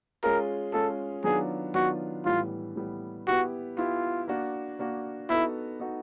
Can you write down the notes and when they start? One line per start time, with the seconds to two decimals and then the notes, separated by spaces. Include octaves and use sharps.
0.23 G#3 C#4 F4 G#4 A#4
0.73 G#3 C#4 F4 G#4 A4
1.24 D#3 F#3 B3 D4 F4 G#4
1.74 D#3 F#3 B3 D4 F4 F#4
2.25 A2 E3 G3 B3 F4
2.76 A2 E3 G3 B3
3.27 B3 E4 F#4 G4
3.78 B3 E4 F4 G4
4.28 A#3 D4 F#4
4.79 A#3 D4 F#4
5.29 B3 D#4 E4 F#4 A4
5.80 B3 D#4 F#4 A4